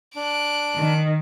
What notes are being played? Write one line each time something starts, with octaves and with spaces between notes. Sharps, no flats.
D4 F#6 D7
D#3